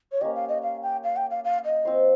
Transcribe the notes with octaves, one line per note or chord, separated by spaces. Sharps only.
C#5
A#3 C#4 G4 D#5
F5
D#5
F5
G5
F5
G5
F5
F5
D#5
F3 C4 F4 C5